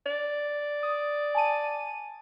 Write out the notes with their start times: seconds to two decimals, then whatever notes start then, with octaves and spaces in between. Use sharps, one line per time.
0.06 D5
0.83 D#6
1.35 G#5 A5 D#7